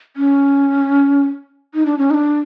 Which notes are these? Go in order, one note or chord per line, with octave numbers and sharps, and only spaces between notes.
C#4
D#4
D4
C#4
D#4
D4